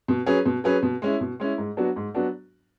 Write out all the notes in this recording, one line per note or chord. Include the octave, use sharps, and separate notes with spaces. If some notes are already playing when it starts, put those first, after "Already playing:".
B2
F#3 C#4 G#4 B4
B2
F#3 C#4 G#4 B4
B2
G#3 C#4 E4
B2
G#3 C#4 E4
G#2
F#3 B3 D4 F#4
G#2
F#3 B3 D4 F#4